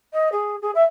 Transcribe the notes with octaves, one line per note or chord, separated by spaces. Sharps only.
D#5
G#4
G#4
E5